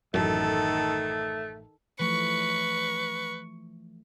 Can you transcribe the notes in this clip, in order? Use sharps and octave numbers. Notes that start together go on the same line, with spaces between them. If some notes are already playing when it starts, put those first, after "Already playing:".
A1 F#2 D#3 A3 A4
E3 F3 A3 B4 C#6